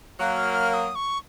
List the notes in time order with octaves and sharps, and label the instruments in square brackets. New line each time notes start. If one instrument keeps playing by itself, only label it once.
[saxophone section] F#3 A#3 [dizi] F#6
[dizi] F6
F6
F6
D#6
C#6